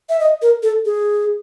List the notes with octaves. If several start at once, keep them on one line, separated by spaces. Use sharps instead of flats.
E5
D#5
A#4
A4
G#4